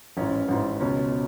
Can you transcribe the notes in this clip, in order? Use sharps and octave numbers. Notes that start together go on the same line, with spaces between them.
A1 G#2 E3 C#4
A1 G#2 E3
C#2 B2 C#4